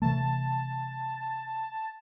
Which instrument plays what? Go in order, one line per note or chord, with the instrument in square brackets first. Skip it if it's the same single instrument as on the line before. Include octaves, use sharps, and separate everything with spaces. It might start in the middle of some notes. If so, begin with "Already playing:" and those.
[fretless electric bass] C3 E3 A3 [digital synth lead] A5